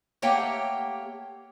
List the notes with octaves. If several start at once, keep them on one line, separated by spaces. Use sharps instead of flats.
A3 A#3 G4 C#5 F#5 G5